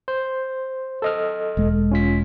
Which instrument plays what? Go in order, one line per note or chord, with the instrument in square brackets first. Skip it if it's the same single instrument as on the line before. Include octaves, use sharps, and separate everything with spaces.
[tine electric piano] C5
A4 D#5 F6
[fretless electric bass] E1 G#3
[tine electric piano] C#4 F4 B6